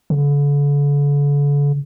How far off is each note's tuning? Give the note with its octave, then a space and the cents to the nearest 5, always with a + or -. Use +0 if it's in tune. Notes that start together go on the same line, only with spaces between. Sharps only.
D3 -40